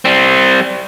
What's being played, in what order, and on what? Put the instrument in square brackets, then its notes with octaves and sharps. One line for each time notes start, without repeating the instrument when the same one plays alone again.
[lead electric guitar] G3 C4